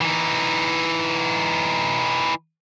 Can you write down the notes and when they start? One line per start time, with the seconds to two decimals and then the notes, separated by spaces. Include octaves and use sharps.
0.01 E3 D#4